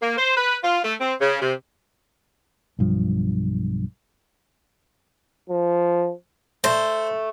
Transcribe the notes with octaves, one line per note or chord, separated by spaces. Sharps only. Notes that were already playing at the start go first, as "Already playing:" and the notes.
A#3
C5
B4
F4
A3
C4
C#3
C3
B1 G2 F3
F3
A3 C5